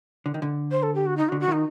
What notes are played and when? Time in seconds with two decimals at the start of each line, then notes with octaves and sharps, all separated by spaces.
0.26 D3
0.34 D#3
0.42 D3
0.71 C5
0.83 A4
0.95 G4
1.06 F#4
1.17 D#4
1.29 F#4
1.32 D3
1.40 F#4
1.48 D#3 D#4